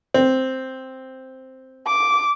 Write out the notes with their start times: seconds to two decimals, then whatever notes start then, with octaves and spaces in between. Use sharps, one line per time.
0.14 C4
1.87 D6